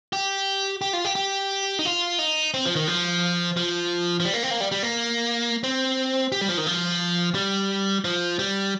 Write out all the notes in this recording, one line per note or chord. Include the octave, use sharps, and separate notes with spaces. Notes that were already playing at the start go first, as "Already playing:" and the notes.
G4
G4
F4
G4
G4
D#4
F4
D#4
C4
F3
D#3
F3
F3
F3
G3
A#3
C4
A#3
G3
G3
A#3
C4
G4
G3
F3
D#3
F3
G3
F3
G3